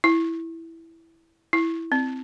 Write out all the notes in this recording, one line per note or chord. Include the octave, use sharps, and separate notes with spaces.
E4
E4
C4